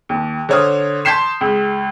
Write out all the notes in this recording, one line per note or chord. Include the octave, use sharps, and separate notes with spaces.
D#2
D3 C5 C#5 D#6 F6
A5 C6 G6 B6 C7 E7
C#2